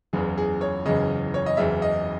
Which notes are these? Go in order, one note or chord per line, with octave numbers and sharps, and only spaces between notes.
F#1 E2 C#3 G#4
G#4
C#5
F#1 E2 C#3 D#5
C#5
D#5
F#1 E2 C#3 E5
D#5